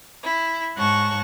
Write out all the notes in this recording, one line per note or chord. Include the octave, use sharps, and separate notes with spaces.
E4
G#2 C#5 F#5 A5 C#6